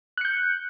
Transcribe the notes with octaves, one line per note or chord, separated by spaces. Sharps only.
F#6 G6 C#7